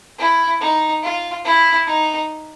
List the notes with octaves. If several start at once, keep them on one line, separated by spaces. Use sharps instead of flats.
E4
D#4
F4
E4
D#4